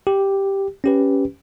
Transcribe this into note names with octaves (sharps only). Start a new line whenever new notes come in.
G4
C#4 G4 B4